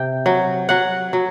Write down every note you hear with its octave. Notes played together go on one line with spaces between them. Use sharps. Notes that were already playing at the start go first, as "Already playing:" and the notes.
Already playing: C3 G5
F#3
F#3 F#5
F#3